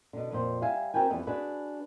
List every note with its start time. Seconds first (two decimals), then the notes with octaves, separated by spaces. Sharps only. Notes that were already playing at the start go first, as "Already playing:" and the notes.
0.13 B2 D3
0.31 F2 A#2 C5
0.62 G3 E5 F5 G#5
0.94 C4 F#4 A#4 B4 G5 G#5
1.10 F2 E3 G3 B3
1.27 D4 F#4 G#4 B4